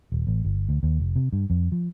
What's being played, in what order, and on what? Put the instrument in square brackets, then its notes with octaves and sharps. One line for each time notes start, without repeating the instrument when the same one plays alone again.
[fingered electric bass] D#1
A1
G1
D2
D#2
F1
C3
G2
F2
F3